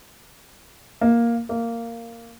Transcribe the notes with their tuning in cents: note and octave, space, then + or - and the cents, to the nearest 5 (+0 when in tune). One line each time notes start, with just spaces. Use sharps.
A#3 +5
A#3 -10